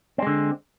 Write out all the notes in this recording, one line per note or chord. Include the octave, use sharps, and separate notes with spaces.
D3 G#3 C4